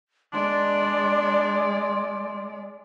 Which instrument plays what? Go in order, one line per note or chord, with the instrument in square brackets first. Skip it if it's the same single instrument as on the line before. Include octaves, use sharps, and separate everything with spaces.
[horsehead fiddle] G#3 D5 [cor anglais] D4 [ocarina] C6